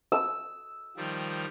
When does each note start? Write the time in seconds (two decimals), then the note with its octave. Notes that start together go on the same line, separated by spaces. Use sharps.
0.12 E6
0.97 D#3 F3 G3